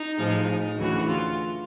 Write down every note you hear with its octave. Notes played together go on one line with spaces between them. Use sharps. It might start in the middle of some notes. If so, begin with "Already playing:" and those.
Already playing: D#4
A2 F3 G#3
D#4
D2 C#3 E3 F#4
F4